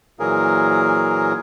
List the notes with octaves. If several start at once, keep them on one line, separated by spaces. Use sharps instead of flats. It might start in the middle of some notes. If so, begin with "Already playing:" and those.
A#2 E3 F#3 G#4 A#4